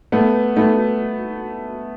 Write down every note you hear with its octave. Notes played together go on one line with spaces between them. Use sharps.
A3 B3
A3 B3